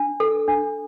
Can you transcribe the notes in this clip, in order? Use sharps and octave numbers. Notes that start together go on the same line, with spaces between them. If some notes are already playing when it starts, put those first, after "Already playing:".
Already playing: D4
A4
D4